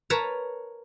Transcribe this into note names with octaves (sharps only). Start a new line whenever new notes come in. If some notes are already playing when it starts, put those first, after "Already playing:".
A#4 B4 C#5 A5 A#5